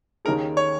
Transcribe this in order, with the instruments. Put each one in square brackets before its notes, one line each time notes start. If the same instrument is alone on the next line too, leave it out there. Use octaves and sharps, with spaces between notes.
[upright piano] D#2 D#3 C#4 G#4 [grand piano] A#4
[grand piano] C#5